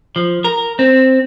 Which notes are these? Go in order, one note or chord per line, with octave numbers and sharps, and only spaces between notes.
F3
A#4
C4